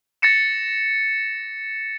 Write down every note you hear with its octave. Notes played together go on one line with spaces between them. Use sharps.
A6 A#6 C#7 E7